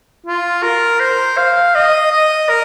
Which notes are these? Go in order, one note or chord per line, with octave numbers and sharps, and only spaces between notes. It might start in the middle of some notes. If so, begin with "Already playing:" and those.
F4
A#4
C5
F5
D#5
D#5
A#4